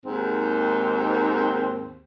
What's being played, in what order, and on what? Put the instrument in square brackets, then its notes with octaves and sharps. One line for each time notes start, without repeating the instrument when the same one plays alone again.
[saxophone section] D#2 G#2 C4